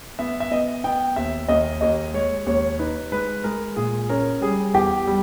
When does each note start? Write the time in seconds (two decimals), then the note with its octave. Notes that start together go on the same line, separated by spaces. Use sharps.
0.19 B3 E5
0.40 E5
0.51 B3 D#5
0.84 B3 G5
1.16 D#2 E5
1.49 D#2 D#5
1.81 D#2 D#5
2.14 G#3 C#5
2.46 D#2 C#5
2.79 D#4 B4
3.12 G#3 B4
3.44 G#3 A#4
3.76 A#2 G#4
4.09 C#4 A#4
4.41 G3 G#4
4.74 E2 G4
5.07 G3